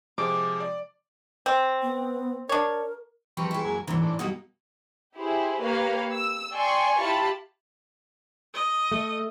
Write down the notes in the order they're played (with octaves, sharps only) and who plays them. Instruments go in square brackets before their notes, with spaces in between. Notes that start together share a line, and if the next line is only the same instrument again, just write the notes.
[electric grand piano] C3 F3 G#3 [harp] D6
[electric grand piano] D5
[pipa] C4
[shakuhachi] B3
[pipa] D4 C#5 [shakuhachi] A#4
[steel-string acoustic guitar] F3 C4 A#4 [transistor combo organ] G3 B4 C#6
[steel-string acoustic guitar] G#3 E4
[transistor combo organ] F#2 A#3 G#5
[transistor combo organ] D2 C3 A#3 [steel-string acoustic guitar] G#2 E3
[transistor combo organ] A2 D4
[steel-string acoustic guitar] B2 G3 A#3 [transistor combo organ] F#3 D#4
[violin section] E4 G4 G#4 C5
A#3 G4 A#4 B4 C#5 F5
E6
D5 G5 G#5 C6 C#6
E4 F4 G4 A5 B5
[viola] D#5
[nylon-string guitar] A3